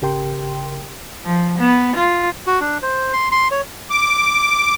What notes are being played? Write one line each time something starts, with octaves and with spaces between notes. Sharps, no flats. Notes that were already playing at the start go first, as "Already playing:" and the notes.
G#1 C#3 G4 A#4 G5 C6
F3
B3
F4
F#4
D4
C5
C6
C6
C#5
D6